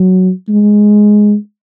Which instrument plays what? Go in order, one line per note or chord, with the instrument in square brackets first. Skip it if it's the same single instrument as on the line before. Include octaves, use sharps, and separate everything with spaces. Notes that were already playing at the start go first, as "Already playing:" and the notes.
Already playing: [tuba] F#3
G#3